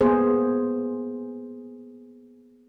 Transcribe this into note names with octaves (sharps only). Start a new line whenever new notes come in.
A#3 B3 G#4 C5